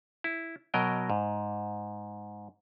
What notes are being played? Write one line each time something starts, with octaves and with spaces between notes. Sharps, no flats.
E4
B2 F#3 A#4 D#5 G5
G#2